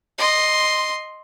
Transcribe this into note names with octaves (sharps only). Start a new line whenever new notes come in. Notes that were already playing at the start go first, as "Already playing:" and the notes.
D#5 C6